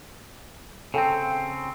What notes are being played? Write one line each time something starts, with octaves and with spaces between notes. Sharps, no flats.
C#3 C4 A4 G5